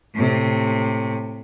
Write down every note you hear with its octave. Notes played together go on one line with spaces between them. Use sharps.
A2 C3